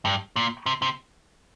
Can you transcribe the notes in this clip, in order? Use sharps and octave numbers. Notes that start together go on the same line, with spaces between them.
G2
A#2
C3
C3